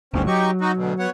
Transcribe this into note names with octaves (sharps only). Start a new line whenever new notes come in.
G1 D2 G2 C4 C#4
F#3 D#4 G4 C#6
D#4 F#4
D2 B2
B3 C#5 F#5